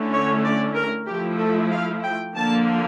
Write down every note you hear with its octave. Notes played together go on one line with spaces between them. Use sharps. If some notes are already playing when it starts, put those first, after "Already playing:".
Already playing: D3 A3 C#4 E4
C#5
D5
A#4
F3 A3 E4 G4
A4
F5
G5
D3 F3 A#3 A5